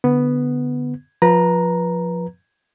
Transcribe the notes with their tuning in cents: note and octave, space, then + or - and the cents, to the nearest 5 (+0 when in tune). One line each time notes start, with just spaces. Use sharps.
D3 -10 B3 +0
F3 +15 B4 -25 A#5 +0